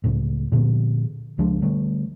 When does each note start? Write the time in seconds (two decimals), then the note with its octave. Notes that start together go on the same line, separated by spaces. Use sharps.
0.04 C#2 A2
0.52 A#2 D3 F3 B3
1.38 C#2 F3 G#3 D4
1.62 D3 G3 A3